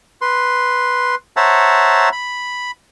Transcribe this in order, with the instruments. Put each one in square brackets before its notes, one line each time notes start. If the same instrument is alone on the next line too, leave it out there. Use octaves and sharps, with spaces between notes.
[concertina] B4 C6
C5 C#5 E5 F#5 A5 A#5
B5